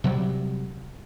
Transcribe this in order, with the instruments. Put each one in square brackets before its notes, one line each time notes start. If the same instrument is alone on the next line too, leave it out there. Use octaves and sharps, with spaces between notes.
[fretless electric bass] C3 F#3 G3